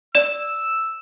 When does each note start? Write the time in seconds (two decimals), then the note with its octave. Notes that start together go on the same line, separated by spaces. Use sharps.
0.15 D5 E6 E7